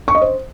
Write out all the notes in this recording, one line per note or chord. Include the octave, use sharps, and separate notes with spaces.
C#6
D#5
C5